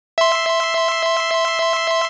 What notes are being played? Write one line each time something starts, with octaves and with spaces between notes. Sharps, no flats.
E5 C6